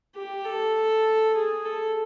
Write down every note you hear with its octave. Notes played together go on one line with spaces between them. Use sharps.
G4
A4
G#4
A4